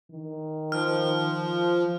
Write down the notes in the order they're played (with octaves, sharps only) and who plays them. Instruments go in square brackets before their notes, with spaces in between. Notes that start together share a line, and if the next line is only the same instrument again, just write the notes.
[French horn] D#3
[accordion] F3 [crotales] F6